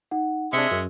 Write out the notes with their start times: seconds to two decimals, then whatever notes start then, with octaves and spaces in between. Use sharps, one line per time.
0.11 D#4 F#5
0.53 C3 G#3 D4 E5 C#7
0.71 F#2